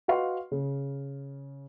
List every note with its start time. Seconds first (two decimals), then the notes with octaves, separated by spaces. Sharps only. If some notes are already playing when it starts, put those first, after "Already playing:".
0.08 F#4 B4 D#5 F5 C6 C#6
0.52 C#3